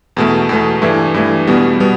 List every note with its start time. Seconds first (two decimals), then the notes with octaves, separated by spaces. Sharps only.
0.17 E2 B2 A3
0.49 E2 B2 A3
0.82 G2 E3 A3
1.14 G2 E3 A3
1.47 E2 B2 G3 B3
1.80 B2 G3 B3